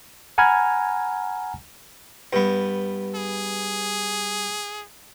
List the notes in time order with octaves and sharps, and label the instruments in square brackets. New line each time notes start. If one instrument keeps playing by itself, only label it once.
[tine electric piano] F#5 G#5 A#5 B5 F6 G#6
[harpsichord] G2 B3
[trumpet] G#4